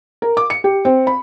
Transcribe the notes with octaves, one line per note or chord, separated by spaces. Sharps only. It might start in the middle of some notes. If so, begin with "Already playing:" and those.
A#4
D6
C#7
G4
C4
B5